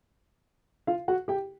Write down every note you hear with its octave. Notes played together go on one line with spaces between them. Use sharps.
F4 F5
F#4 F#5
G4 G5